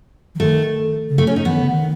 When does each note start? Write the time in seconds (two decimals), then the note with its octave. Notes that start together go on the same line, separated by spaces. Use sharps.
0.35 E3
0.40 D#3 A3
1.09 C#3
1.18 A3
1.27 C#4
1.36 D#4
1.45 E3 B3
1.53 D#3
1.61 C#3
1.70 D#3